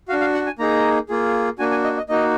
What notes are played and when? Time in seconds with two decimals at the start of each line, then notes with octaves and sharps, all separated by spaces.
0.08 F#4 F5
0.13 D4
0.21 F5
0.34 F#5
0.46 G#5
0.59 A#3 D#4 G#4 A#5
1.09 A#3 F4 G#4
1.59 A#3 D4 F#4 G#5
1.71 G#5
1.84 D#5
1.97 D#5
2.09 A#3 D#4 F#4 D#5